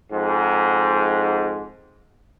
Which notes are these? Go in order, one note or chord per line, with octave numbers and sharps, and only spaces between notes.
F2 G#2